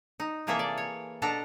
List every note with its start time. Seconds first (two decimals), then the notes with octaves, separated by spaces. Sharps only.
0.20 D#4
0.47 C3 E3 A#3 G#4 A4 E5
0.59 D5
0.78 C#5
1.22 B2 D4 A4 A#5